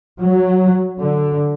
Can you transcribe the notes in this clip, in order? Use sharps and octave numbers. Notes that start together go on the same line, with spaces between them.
F#3
D3